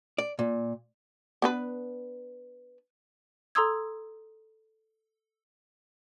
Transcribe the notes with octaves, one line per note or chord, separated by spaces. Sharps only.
D5
A#2
B3 D4 B4
A4 A#5 C6 D#6 E6 G#6